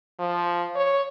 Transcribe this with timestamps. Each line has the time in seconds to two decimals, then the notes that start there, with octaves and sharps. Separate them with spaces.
0.19 F3
0.75 C#5